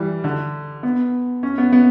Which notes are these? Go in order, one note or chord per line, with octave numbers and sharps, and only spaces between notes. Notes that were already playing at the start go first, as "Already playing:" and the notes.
Already playing: E3 G3
D3
B3
C#4
B3
B3